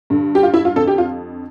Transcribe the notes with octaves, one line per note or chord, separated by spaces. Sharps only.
G2 D3
G4
F4
E4
F4
F2 D3 A4
G4
F4